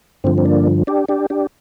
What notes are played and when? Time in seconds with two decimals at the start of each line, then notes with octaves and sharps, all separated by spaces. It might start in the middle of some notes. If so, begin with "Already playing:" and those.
0.24 G2 D3 F3 C4
0.38 C4
0.45 A#3 D4
0.87 D4 G4
1.09 D4 G4
1.30 D4 G4